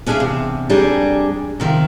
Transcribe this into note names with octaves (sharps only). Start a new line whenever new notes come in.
B3 C#4 D4 G#4 E5 F5
E2 C3
F2 G3 D4 G#4 A#5
C3 D#3 F3